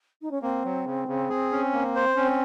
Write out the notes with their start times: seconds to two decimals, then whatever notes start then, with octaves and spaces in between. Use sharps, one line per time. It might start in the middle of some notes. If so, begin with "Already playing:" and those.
0.22 D#4
0.31 C#4
0.42 A#3 C4
0.64 F#3
0.86 C#3
1.08 C#3
1.29 G#4
1.51 C#4
1.73 A#3
1.95 C5
2.16 C4 C#4